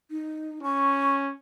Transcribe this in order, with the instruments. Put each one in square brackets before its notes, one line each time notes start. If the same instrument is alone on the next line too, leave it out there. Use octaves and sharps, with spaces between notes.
[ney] D#4
[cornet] C#4 [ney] C#6